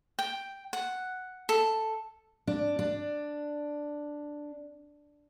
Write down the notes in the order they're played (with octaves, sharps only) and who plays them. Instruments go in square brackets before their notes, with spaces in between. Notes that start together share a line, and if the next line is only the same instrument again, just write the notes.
[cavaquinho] G5
F#5
A4
[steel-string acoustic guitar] D4
D4